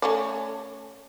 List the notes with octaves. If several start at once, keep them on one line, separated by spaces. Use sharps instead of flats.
A3 C#4 D5